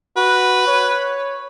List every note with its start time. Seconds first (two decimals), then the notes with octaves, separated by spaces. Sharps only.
0.16 F#4 B4
0.67 C#5